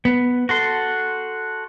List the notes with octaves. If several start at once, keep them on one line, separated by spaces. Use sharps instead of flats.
B3
F#4 A4 C6